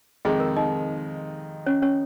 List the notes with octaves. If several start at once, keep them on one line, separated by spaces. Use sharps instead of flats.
F2 C3 D#3 G#3 G#4
A#4
D#4 D#5
C#4 C#5
C#4 C#5